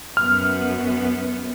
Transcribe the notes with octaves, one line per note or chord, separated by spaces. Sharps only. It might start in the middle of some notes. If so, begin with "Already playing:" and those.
F#2 B3 F6